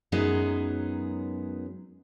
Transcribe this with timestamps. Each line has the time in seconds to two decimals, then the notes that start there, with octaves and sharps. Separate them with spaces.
0.12 F#2 F#3 G#3 B3 D#4